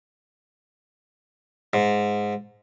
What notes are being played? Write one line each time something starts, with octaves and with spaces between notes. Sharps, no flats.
G#2